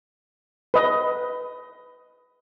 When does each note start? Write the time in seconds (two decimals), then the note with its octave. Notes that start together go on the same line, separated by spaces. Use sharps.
0.74 B4 D#5